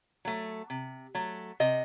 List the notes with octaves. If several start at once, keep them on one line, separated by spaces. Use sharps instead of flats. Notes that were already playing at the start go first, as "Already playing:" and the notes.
F#3 A3
C3
F#3 A3
C3 D#5